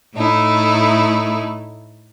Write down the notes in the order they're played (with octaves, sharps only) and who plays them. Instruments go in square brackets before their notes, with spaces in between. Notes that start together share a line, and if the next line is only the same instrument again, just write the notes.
[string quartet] A2 A3 D#4 E4